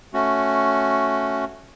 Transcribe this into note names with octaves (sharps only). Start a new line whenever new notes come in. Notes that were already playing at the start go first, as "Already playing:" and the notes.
A3 C#4 F#4